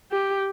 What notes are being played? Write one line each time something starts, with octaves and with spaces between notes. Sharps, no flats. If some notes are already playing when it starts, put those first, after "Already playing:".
G4